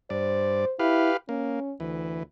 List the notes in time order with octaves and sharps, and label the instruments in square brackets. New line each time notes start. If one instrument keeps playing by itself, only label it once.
[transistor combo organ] G2 D5 [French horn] C5
[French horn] E4 [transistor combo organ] G4 B4 F5
[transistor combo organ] A#3 [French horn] C#4
[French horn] D2 [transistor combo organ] E3